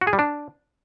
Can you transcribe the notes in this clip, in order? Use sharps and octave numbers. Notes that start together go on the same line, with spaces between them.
F#4
G#4
G3
D4